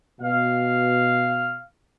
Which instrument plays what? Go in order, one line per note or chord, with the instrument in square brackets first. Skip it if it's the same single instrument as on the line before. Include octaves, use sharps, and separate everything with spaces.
[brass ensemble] B2 F5